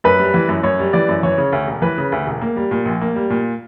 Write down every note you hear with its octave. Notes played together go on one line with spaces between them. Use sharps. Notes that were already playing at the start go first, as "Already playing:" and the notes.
F#2 B4
G3
E3
F#2
F#2 C#5
G3
E3 D5
F#2
E3 C#5
C#3
D2
E1
E3 B4
C#3
D2
E1
A#3
G3
A#2
A#1
A#3
G3
A#2